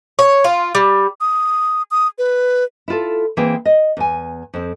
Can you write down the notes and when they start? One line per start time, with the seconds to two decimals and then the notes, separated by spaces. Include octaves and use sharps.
0.19 C#5
0.44 F4
0.75 G3
1.21 D#6
1.91 D#6
2.18 B4
2.88 E4 F4 A4
3.37 E3 A#3 C4 G#4 G5
3.65 D#5
3.97 E2 G#5
4.54 F2 C4